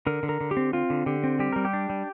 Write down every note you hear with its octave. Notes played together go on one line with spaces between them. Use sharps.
D3 A#4
D3
A#4
D3
G4
C4
C4 F4
D3
D3 G4
C4
G3 G4
G3 A#4
G4
D4
G3